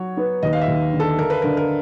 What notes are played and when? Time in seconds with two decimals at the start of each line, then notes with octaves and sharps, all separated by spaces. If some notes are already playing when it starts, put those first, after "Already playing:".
Already playing: F#3 F#4 C#5
0.17 B3
0.43 D#2 D#5
0.53 F5
0.61 E5
0.68 D#2
0.93 D3
1.00 A4
1.18 D3 A#4
1.30 B4
1.42 D3 A#4
1.57 A#4